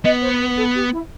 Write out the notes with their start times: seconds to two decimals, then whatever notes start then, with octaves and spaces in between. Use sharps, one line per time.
0.04 B3 D#5
0.21 C5
0.40 B4
0.56 A4
0.74 G4
0.92 E4